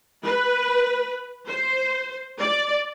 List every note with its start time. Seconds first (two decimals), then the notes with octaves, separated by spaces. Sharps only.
0.24 B4
1.47 C5
2.39 D5